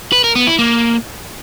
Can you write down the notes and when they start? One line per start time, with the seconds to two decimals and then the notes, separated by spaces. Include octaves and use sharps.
0.12 B4
0.24 A#4
0.35 B3
0.47 E4
0.59 A#3